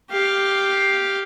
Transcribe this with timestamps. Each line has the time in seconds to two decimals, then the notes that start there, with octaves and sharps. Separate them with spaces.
0.10 G4 F5